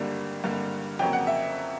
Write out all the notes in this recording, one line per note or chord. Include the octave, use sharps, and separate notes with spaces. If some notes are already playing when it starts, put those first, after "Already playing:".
Already playing: G#1 G2 D3 G3 A#3
G#1 G2 D3 G3 A#3
F2 C#3 F#3 A#3 G5
F#5
E5